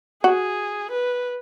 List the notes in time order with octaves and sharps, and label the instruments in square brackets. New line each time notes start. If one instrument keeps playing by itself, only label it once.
[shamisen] F#4 [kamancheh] G#4
[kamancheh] B4